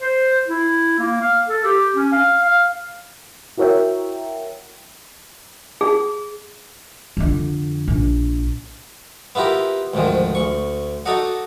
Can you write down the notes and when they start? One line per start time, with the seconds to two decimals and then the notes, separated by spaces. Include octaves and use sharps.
0.01 C5
0.48 E4
0.99 A#3
1.21 F5
1.48 A4
1.65 G4
1.96 C#4
2.12 F5
2.43 F5
3.58 E4 F#4 A#4 C#5 E5 G5
5.81 G#4
7.17 F2 D3
7.88 A#1
9.35 B3 E4 F4 G4 A#4
9.93 D2 G#2 D#3 F3
10.35 D2 C#6
11.06 D#4 F#4 A4 D5 D#5 F#5